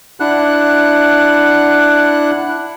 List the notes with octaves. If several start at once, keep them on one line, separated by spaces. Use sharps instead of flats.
D4 E4 F#5 F#6